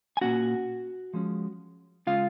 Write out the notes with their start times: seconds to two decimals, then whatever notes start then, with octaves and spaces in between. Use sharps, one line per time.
0.17 G#5
0.21 A#2 F#3 A#3 C#4 F#4 F#5
1.14 F3 G#3 C#4
2.07 C#3 G#3 C#4 F4 F5